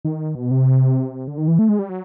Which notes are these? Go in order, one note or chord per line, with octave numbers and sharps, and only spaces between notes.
D#3
B2
C3
D3
D#3
E3
A3
G#3
G3
F#3